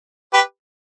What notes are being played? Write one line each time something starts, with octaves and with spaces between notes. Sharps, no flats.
G4 B4